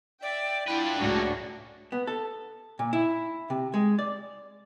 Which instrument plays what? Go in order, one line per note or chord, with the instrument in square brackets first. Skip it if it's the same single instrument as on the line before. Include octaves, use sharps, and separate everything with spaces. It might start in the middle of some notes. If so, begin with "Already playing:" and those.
[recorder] D5 [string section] E5 G5
[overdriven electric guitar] D4 B4 [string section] E4 F4 F#5 [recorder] G5
[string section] C#2 G#4 [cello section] A2 D4 F#4 [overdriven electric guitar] F#3 A#3
[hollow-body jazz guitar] B3
A4
A#2
E4
C3
G#3
D5